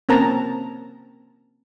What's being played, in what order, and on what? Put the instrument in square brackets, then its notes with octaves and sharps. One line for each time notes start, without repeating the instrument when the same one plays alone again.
[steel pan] A#3 C4 C#4 A#4 A5 A#5